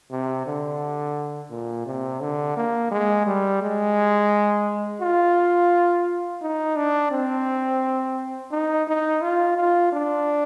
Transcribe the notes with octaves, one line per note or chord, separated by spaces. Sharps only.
C3
D3
A#2
C3
D3
A#3
G#3
G3
G#3
F4
D#4
D4
C4
D#4
D#4
F4
F4
D4